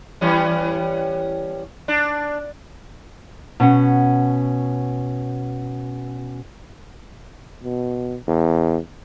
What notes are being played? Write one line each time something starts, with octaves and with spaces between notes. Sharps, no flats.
E3 G3 C#4
D4
B2 C#4 F#5
B2
E2